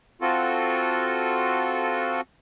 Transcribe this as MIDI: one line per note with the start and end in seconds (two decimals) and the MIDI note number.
0.21 2.21 60
0.21 2.21 65
0.21 2.21 66
0.21 2.21 69